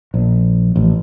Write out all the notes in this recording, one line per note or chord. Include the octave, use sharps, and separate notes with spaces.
A#1
A1